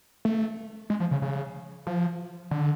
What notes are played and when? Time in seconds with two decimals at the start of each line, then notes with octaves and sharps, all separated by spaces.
0.25 A3
0.90 G#3
1.00 F3
1.11 C#3
1.22 C#3
1.87 F3
2.51 D3